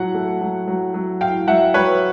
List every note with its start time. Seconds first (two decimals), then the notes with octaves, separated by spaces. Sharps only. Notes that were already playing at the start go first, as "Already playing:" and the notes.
Already playing: A2 F#3 F#5
0.15 A3
0.41 F#3
0.68 F#3
0.94 F#3
1.21 A2 F5 G5
1.47 F#3 E5 F#5
1.74 F#3 B4 C#5